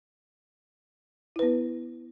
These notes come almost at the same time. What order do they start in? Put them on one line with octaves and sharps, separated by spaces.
E4 B4 B3